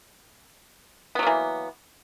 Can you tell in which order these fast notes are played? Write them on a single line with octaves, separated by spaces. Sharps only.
B3 F#3 A#3 E3